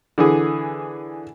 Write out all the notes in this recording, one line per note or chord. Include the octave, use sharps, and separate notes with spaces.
D3 E3 G#4